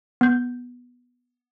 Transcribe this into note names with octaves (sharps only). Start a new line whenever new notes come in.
B3 G6